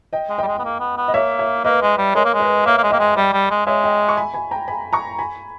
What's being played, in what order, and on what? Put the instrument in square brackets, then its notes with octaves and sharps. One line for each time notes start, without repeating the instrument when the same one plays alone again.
[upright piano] D#5 G5
[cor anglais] G#3
[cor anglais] G3 [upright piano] D#5 G5
[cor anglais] G#3
B3
A#3
B3
B3
[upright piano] D#5
[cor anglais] A#3 [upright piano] C#5 E5
[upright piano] C#5 E5
[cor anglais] A#3 [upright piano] B4 D#5
[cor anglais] G#3
G3
[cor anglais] G#3 [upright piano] A#4 C#5
[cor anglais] A#3
G#3
[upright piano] B4 D#5
[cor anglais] A#3 [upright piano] C#5 E5
[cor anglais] A#3
G#3
[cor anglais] A#3 [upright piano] D#5 G5
[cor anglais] G#3
[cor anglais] G3 [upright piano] D#5 G5
[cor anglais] G3
G#3
[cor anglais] G#3 [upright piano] C#5 E5
[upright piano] D#5 G5
C#6
G#5 B5
G#5 B5
G5 A#5
G#5 B5
A#5 C#6
G#5 B5